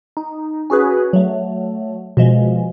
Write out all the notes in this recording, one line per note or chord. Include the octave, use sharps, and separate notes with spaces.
D#4
C#4 F#4 G#4 B4
F#3 A3
B2 F3 G#3